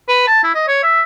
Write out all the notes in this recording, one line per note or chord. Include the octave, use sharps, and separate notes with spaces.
B4
A5
E4
D#5
C#5
E5